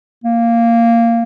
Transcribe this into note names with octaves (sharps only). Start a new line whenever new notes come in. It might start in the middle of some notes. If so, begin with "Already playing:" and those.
A#3